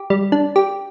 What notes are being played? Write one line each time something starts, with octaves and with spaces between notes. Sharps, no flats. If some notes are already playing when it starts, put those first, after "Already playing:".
Already playing: G4
G3
D4
G4